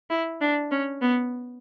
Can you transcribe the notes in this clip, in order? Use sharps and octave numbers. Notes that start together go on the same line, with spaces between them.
E4
D4
C#4
B3